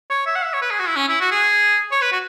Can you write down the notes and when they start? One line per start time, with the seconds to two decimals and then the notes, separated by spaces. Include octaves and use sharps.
0.10 C#5
0.26 E5
0.35 F#5
0.44 E5
0.54 C#5
0.62 B4
0.71 G#4
0.79 F#4
0.88 E4
0.96 C#4
1.08 E4
1.20 F#4
1.31 G#4
1.91 C#5
2.01 B4
2.12 F#4